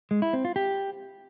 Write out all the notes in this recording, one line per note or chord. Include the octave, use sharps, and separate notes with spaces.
G#3
E4
C4
F4
G4